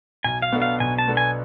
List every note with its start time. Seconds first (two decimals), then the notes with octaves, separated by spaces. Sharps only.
0.24 B1 G#5
0.42 F5
0.52 B2 B3 D4 A4
0.62 F5
0.80 B1 G#5
0.98 A5
1.08 B2 B3 D4 A4
1.17 G#5